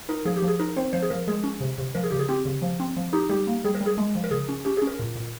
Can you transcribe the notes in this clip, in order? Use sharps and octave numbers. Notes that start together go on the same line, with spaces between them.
D#4 A#4
F3 G#4
G4
F3
G#4
D#4 A#4
C4 C5
F3 C5
G#4
F3 A#4
G#3 G#4
C#4
C3
C3
F3 A#4
G#4
C#3 G4
G#4
C4 G4
C#3
F3
C4
F3
D#4 G4
G3 G4
A#3
G3 G#4
A#4
G3
G#4
G#3
F3
A#4
C#3 G#4
C#4
C#4 G4
C#4 G#4
A#4
A#2
A#2